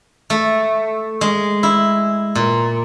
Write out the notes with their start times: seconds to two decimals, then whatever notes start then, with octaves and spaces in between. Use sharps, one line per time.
0.30 A3
1.21 G#3
1.63 E4
2.35 A#2